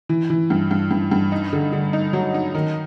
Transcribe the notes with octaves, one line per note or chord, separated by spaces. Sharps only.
E3
E3
G2
G2
G2
G2
D#4
D3
D3
D#4
F#3
D#4
D#3